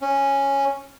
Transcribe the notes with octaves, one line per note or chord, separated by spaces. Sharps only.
C#4